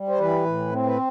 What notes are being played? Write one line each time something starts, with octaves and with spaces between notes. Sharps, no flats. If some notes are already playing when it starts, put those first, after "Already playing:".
Already playing: G3
C5
E3 B4
A2
C4
B4